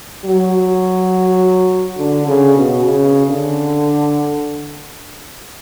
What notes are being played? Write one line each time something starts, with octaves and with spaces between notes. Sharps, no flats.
F#3
D3
C#3
B2
C#3
D3